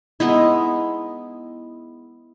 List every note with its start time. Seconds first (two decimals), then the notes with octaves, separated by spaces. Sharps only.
0.20 G#3 B3 D#4 E4